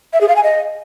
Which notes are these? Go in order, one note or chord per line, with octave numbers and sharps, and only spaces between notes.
E5
G#4
F5
G#5
D#5